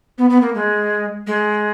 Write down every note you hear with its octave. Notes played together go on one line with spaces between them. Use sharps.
B3
B3
A#3
G#3
G#3